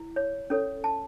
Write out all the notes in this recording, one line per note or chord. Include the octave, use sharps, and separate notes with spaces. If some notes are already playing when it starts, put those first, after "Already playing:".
Already playing: E4
C#5
C#4 A4 C#5
A5